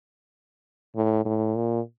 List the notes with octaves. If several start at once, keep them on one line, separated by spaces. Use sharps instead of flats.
A2
A2
A#2